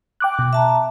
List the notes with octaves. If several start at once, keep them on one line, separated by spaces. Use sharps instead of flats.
G5 D6 F#6
B2
E5 A5 A#5